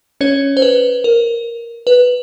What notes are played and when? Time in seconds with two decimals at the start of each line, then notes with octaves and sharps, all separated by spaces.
0.21 C#4 C#5
0.57 C5
0.62 B4
1.04 A#4
1.87 B4